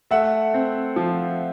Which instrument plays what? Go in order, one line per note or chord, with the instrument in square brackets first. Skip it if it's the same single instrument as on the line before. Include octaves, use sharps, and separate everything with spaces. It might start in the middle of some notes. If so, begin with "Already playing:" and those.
[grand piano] A3 [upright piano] E5 F#5
[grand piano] C4
F3